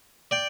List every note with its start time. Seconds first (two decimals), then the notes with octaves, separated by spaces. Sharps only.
0.31 D5 G5